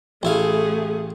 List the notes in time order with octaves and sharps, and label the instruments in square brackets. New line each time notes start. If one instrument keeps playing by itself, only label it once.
[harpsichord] A1 E4 F5 [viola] A3 G#4